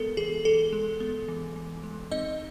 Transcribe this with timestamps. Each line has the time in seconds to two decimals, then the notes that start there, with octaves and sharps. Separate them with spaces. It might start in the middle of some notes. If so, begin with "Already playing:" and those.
Already playing: G#3 B3 A4 A#4
0.17 E3 G#4
0.45 E3 A4
0.73 G#3
1.00 B3
1.28 E3
1.56 E3
1.84 G#3
2.11 C4 D#4 D#5